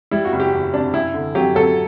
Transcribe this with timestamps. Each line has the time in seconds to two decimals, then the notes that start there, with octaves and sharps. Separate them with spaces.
0.11 G3 E4
0.25 F#4
0.33 F#1
0.40 G4
0.52 E2
0.73 C3 D4
0.94 F#2 E4
1.14 D3
1.35 F#3 G4
1.55 F#3 A4